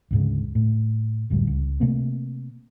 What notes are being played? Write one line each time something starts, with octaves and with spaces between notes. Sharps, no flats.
D2 G#2 C#3
A2
F#1 D2 A2 G3
C#2
C3 A3 A#3 C4